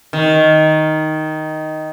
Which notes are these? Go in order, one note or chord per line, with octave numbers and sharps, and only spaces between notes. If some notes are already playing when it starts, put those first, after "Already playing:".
D#3